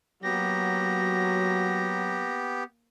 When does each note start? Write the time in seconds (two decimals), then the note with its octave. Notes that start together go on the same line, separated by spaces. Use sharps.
0.23 F#3 A#3 B3 G4 A#6